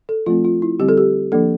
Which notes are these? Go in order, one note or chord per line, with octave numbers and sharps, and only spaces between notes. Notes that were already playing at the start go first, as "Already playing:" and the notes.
A4
F3 A3 C4 F4
F4
E4
D3 G3 C4 G4
A4
G4
F3 A#3 D4 A4